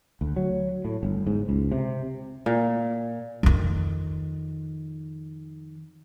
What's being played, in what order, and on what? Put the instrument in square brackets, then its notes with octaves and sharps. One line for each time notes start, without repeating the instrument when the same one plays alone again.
[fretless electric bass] D2
F#3
A2
G1
G#2
C#2
C3
[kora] A#2
[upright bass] F2 D#3